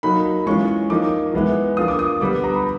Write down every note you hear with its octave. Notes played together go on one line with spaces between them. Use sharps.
F#3 A#3 D#4 B5
E3 G#3 C#4 F4 C#6
F3 A#3 D#4 D6
E3 G#3 B3 E4
F3 A#3 D4 F4 D#6
D6
D#6
D3 G3 B3 D6
A#5
B5